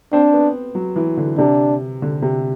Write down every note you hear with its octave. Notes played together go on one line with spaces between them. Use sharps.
C4 D4
B3
F#3
E3
D3
C3 D4
D3
C3